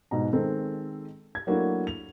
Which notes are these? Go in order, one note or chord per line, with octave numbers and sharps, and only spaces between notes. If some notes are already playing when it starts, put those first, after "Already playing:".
G#2 B2 A#5
D#3 G#3 C4 A4
G#6
F#3 A3 A#3 D4 E4 F#4
F7